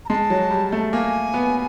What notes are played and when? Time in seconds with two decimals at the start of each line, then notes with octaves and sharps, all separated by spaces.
0.05 A#5
0.09 G#3 A5
0.30 F#3
0.50 G3
0.72 A3
0.92 A#3 G#5
1.34 B3